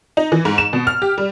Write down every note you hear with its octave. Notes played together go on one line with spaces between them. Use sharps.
D#4
E3
G#2
E7
B2
F6
G4
G3